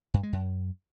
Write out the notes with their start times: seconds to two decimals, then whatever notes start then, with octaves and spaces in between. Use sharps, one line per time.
0.14 G2
0.23 G#3
0.33 F#2